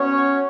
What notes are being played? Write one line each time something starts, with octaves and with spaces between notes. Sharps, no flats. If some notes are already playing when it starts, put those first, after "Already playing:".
Already playing: B3 C#4 F#4 C#5